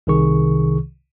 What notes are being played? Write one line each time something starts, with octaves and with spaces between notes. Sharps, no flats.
C2 C3 D#3 G#4 C#6